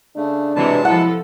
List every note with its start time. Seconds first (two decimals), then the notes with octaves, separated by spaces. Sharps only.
0.16 C#3 A3 D4
0.56 C3 E3 F#3 G#3 A5
0.85 F3 E4 A4 F#5